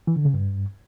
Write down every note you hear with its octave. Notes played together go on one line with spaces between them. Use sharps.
E3
D3
C#3
G2